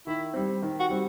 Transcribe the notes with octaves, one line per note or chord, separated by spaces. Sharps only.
D#3 E4
G3 C4
D#3
F#4
G3 C4